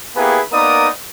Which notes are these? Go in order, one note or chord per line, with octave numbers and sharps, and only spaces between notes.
A#3 B3 E4 G4 G#4 B4
A#3 B3 D#4 A#4 D5 D#6